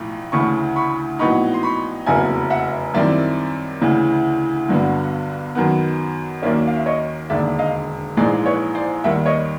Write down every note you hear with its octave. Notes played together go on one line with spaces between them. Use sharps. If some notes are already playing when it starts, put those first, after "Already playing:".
Already playing: B1 A2 F3 A3
D2 C#3 E3 A3 B5 C#6
B5 C#6
A#1 A2 F#3 B3 D#4 B5 C#6
C6
B5 C#6
F1 E2 C#3 F#3 A#3 F#5 G#5
E5 F#5
F#2 D#3 G3 C4 E4 D5 E5
D2 C#3 E3
G1 G2 D3 F#3 B3
F#2 D#3 F#3 B3
D#2 D#3 F#3 A#3 C#4 D5 E5
F5
E5
C#5 D#5
E1 D#2 D3 D5 E5
D#5 F5
A#1 G#2 E3 G#3 C5 D5
B4 C#5
C5 D5
D#2 D#3 G3 E5 F#5
C#5 D#5